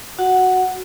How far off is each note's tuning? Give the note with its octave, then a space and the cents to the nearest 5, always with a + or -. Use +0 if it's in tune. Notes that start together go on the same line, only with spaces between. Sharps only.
F#4 +0 F#5 +0